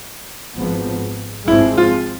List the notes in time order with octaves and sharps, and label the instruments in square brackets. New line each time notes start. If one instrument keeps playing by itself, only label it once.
[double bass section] G#1 G#2 F3 B3
[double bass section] G#1 G#2 F3 G#3 C4 [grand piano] E4
[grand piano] F4